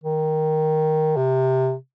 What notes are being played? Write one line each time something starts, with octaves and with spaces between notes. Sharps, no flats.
D#3
C3